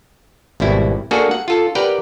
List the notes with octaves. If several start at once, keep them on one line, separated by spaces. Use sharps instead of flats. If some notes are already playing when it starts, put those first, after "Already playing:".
G#1 B2 G3 E4
A#3 D4 F#4 G#4 A4
F#5
F4 A4
G4 A#4 B4 D5 F#5 G5